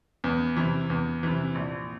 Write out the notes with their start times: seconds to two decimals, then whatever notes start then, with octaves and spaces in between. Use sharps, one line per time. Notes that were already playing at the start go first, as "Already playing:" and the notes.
0.24 E2
0.56 C3 E3
0.90 E2
1.23 C3 E3
1.55 A#1